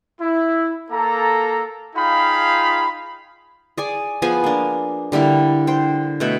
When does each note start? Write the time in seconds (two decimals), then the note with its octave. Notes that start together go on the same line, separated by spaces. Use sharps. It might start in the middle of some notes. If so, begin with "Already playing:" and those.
0.20 E4
0.91 A#3 A4 A#5
1.95 D#4 F4 G#4 F5 G5 B5
3.78 G#4 D5 G#5
4.22 F3 B3 G#4 G#5
4.44 A#3 D4
5.12 D3 G3 A#3 E4
5.67 C5 G5
6.20 B2 A3 B5